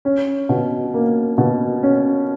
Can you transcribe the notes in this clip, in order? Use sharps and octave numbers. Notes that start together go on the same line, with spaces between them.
C#4
B2
A#3
B2
C#4